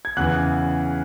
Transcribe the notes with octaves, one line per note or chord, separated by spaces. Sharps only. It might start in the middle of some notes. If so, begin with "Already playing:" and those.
G#6
E2 C#3 E3 F#6